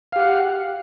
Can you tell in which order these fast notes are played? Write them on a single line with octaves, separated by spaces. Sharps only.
F5 G4 F#5